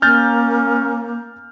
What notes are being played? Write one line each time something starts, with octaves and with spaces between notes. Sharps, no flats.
A#3 C#4 F6 G6 A6